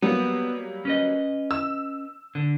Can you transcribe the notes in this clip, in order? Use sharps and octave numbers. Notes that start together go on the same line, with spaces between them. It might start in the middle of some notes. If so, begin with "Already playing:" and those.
F#3 G3 A#3 B3
C#4 B4 D#5
E6
D3